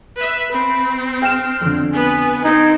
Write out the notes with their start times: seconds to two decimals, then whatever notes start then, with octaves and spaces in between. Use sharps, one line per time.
0.16 B4 E5
0.51 C4 B5
1.22 G5 F6 E7
1.61 F2 D3
1.92 B3 B4 G#5
2.44 C4 D#4 G#6